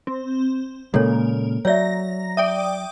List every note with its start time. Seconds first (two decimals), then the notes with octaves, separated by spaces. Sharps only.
0.07 C4
0.94 A#2 C#3 G#3 A#3 A4 C#5
1.65 F#3 C#5 D5 E5 A#5 A#6
2.37 D5 E5 G5 D#6